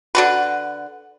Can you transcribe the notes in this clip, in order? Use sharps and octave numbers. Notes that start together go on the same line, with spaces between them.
D3 F#4 B4